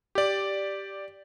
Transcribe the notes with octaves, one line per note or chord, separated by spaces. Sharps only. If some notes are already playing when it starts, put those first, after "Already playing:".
G4 D5